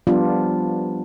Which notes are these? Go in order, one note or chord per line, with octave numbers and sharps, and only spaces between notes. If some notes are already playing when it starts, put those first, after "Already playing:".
F3 G3 B3 D4 F4